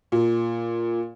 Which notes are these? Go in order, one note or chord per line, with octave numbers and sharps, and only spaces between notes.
A#2